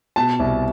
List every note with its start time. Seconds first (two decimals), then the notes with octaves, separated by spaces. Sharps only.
0.16 B2 A5
0.40 C2